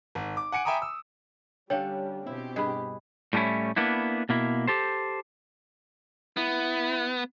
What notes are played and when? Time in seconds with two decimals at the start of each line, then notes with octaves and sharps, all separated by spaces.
0.15 G#1
0.37 D6
0.52 F#5 G#5 C#7 D7
0.65 E5 G5 G#5 A#5 B5 D#6
0.82 E6
1.70 D3 G3 C#4 D4 C#5 F5 G5
2.26 B2 C4 E4 G4
2.56 G2 G#4 B4 D#5 B5
3.33 A2 G3 A3 C#4 E4
3.76 A#3 B3 D4 E4
4.29 B2 A#3 E4
4.67 G4 A4 C5
6.37 B3 E4